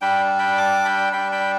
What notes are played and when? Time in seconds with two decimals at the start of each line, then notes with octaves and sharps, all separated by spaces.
0.01 G3 D4 G5 B5
0.39 G5 B5
0.57 A5 D6
0.85 G5 B5
1.13 G3 D4 G5 B5
1.32 G5 B5